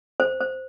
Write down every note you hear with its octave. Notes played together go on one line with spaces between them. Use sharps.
C5
C5